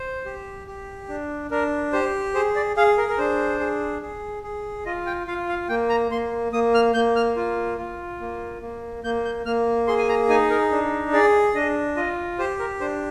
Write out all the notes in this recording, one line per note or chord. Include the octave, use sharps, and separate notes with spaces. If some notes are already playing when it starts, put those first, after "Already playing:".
Already playing: C5
G4
G4
D4
D4 A#4
G4 C5
G#4 C5
D5
G#4 F5
A#4
A#4
D4 C5
G#4
G#4
G#4
F4 D#5
G5
F4 F5
F5
A#3 G5
A#5
A#3 C6
A#3 D#6
F6
A#3 G6
F6
F4
F4
A#3
A#3
A#3 G6
G6
A#3 F6
G#4 C6
G#5
A#5
D#4 G#5
A#4
D4
G#4 D5
D4 D#5
F4 D#5
G4 C5
A#4
D4 C5